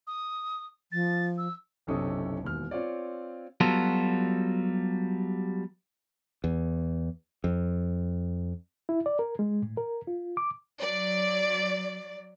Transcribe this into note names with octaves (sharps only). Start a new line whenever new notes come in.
D#6
F3 A6
E6
F#1 B1 C3 C#4 A4 D#6
E1 D#2 F6
C4 F4 C#5 D5
F#3 G3 B3 F4 F#4 A4
E2
F2
E4
D5
A#4
G#3
A2
A#4
F4
D6
F#3 D5